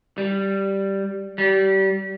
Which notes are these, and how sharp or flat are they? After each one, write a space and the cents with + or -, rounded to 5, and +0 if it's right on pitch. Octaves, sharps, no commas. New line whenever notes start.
G3 -5
G3 -30